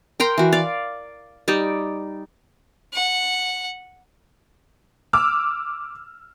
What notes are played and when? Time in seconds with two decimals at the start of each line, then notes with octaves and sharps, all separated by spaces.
0.20 A#4 G5 A#5 C6
0.38 E3 F#4
0.52 D5 F5
1.48 G3 D#4 D5
2.94 F#5
5.13 D6 E6 F6